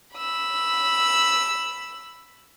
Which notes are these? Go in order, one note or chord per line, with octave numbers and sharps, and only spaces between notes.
B5 E6